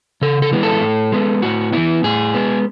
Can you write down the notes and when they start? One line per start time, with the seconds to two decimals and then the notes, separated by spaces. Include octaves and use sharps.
0.22 C#3 A4
0.42 A4
0.52 E3 G#3 B3
0.63 A4
0.82 A2
1.12 G#3 B3
1.42 A2 F#4
1.73 E3 B3 E4
2.04 A2 G#4
2.34 G#3 B3